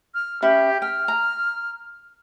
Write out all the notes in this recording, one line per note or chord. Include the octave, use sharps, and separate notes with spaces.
F6
C#4 G4 E5 B5
G5 F6
A#5